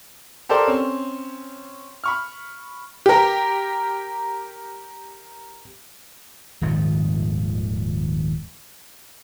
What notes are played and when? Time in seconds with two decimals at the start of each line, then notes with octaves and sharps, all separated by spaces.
0.49 G4 A4 A#4 C5 D5
0.67 C4 C#4
2.04 B5 C#6 F6
3.06 G4 A#4
6.61 D#1 G#2 D#3 F3